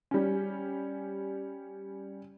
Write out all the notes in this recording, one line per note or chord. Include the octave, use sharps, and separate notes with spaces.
G3 C#4